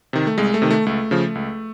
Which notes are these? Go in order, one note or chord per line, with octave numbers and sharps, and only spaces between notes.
C3 D#3
A3
C2 G#3
A3
C3 D#3
A3
C#2 A3
C#3 F3
C#2